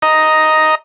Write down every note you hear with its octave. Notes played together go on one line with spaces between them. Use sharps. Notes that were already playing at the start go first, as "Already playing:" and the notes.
D#5 A#5